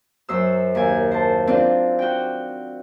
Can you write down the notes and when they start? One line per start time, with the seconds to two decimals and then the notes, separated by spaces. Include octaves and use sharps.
0.29 F#2 C5 E6
0.75 D#2 G#5
1.11 C5 A5
1.47 C4 D4 F4
1.99 F#4 G5